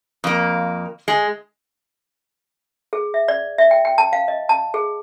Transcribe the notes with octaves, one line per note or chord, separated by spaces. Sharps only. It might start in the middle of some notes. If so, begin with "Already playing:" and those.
F2 A#3
G#3
G#4
E5
D5
E5
G5
G5
A5
F5
D#5
A5
G#4